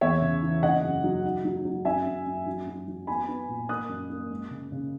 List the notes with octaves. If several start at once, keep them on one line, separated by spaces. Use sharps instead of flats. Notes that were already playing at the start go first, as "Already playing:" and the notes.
E2 C#5 E5
C#3
E3
C#3 D#5 F#5
F#2
F#3
D#4
F#3
F#3
F#2 E5 G#5
F#2
F#2
F#3
F#3
F#3
B3 G#5 B5
B3
A#2
A#3 D#6 F#6
F#2
A#3
G#3
C#3
C#3